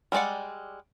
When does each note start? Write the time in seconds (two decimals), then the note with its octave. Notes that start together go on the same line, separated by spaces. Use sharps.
0.12 G3 G#3 C4 D5 F#5